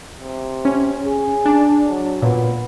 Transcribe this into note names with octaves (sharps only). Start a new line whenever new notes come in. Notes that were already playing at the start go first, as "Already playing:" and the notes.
C3
C#4
G#4
D4
F#3
A#2 B3